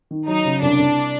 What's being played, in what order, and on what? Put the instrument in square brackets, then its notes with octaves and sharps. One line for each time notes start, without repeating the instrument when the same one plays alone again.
[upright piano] D#3
[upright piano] F#3 [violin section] D#4
[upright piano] C#3
[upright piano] C2 [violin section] D4
[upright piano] C2